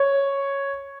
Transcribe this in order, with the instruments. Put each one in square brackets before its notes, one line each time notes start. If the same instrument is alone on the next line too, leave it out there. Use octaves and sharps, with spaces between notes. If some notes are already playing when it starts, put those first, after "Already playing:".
Already playing: [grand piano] C#5